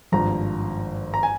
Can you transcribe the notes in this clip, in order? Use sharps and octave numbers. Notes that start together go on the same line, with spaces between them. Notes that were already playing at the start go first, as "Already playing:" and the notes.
G#1 G2 F3 A#5
A#5
G#5